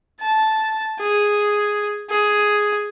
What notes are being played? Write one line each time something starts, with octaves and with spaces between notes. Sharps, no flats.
A5
G#4
G#4